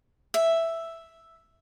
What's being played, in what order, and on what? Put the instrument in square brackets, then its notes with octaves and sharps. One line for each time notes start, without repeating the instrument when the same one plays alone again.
[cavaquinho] E5